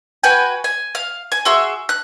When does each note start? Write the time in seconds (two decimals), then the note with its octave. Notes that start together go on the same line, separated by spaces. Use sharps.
0.23 F#4 B4 G5 G#5
0.64 G#5
0.95 F5
1.32 G#5
1.45 F#4 G#4 E5 C6
1.89 F#6